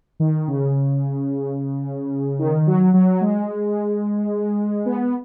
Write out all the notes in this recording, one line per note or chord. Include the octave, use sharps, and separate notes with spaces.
D#3
C#3
D#3
F#3
F#3
G#3
B3